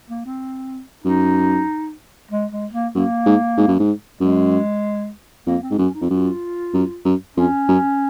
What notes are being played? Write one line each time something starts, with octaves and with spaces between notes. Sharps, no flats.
A#3
C4
F#2 D#4
G#3
G#3
A#3
F#2 A#3
G#2
G#2
F#2
G#2
F#2 G#3
F2 A#3
C4
G#2
F#2 C#4
D#4
F2
F#2 F4
F#2
F#2
F2 C#4
F#2